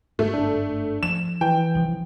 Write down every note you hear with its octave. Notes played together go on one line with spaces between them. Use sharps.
G1 G#2 A3
D4
F3 E7
E3 G5
C2 F3